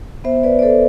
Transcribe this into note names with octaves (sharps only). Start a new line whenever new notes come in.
B3 C5 E5
B4 D5
D5
B3 A4 C5